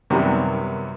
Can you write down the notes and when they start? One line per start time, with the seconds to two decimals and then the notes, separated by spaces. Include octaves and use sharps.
0.10 F#2 C3 D#3 F#3 G3 B3